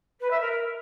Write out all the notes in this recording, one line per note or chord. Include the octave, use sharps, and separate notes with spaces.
B4
E5
A#4